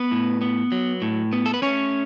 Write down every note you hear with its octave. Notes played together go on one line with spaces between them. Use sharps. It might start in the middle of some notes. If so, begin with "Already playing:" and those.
Already playing: B3 B4
A2
B3
F#3
A2
B3
A4
B4
A3 C#4 C#5